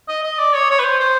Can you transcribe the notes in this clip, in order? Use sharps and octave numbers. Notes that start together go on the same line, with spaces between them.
D#5
D#5
D5
C#5
C#5
B4
C5
C5